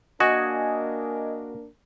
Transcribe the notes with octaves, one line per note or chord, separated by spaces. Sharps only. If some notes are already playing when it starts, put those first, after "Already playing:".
A#3 D4 F#4 A#4 D#5 G#5